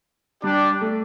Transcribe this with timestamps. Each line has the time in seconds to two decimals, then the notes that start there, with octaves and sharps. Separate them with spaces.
0.43 G3 D4 G4 D5
0.81 A3